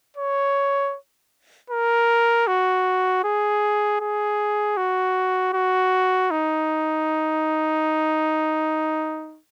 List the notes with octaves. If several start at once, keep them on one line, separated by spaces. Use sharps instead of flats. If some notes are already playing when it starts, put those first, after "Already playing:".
C#5
A#4
F#4
G#4
G#4
F#4
F#4
D#4